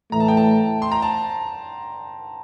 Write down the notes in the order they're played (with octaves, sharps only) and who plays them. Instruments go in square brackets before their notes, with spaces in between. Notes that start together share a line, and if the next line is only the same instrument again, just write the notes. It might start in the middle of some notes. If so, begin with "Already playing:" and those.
[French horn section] A2 E3 A3 [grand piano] A#5
[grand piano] A5
G5
A5
C6
A#5
A5